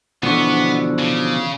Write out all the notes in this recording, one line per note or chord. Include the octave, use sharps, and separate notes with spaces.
B2 D3 E3 F3 B3 D4 C#6
C#3